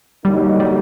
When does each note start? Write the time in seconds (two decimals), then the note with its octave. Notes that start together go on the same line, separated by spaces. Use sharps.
0.24 D3 F#3 G3 A#3 D#4
0.60 G3